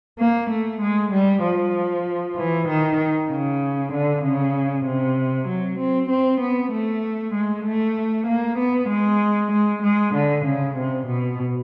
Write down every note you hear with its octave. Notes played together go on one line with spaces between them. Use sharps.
A#3
A3
G#3
G3
F3
E3
D#3
C#3
D3
C#3
C3
F#3
C4
C4
B3
A3
G#3
A3
A#3
B3
G#3
G#3
G#3
D3
C#3
C3
B2